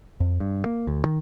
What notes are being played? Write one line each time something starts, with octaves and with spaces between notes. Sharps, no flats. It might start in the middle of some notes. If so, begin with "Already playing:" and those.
F2
G2
A#3
D2
D#3